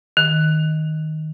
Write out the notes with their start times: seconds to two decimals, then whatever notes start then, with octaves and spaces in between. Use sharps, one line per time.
0.17 D#3